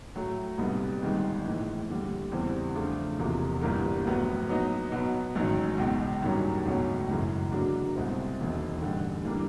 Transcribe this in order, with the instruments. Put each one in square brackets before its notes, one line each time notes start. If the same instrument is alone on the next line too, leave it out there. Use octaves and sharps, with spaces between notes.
[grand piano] A2 F#3 A3
C2 A#2 G3 B3 D#4
G1 G2 D#3 G#3
A#1 A2 E3
D#2 D3 G3
E2 C#3 E3 G3 C4
C#3 F3 A3 D4 F4
E1 E2 C3 F3 A#3
G1 G2 E3 G3 A#3
A#1 A2 F#3 B3
A#2 F#3 B3 D#4 F#4
B2 F#3 B3
A1 G#2 D#3 F#3
C#2 B2 G#3
G2 D#3 F#3 A#3 C#4
C#2 B2 F#3 A3 C#4
F#2 C#3 E3 G#3
D3 F#3 A#3 D4 F#4
C2 B2 G#3 C4 E4
E1 D#2 D#3
A1 G2 D3
E3 G3 A#3 D4